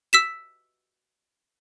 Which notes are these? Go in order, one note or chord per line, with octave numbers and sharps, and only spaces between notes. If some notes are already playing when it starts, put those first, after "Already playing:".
E6 B6 E7